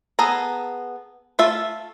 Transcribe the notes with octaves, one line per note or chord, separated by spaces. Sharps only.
B3 G#4 A4 G#5 A#5
A3 F4 A4 E5